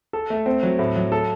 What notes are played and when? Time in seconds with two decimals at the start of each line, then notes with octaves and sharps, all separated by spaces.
0.13 A4
0.30 A3
0.46 C4
0.63 F#3
0.79 A2
0.96 F#3
1.12 A4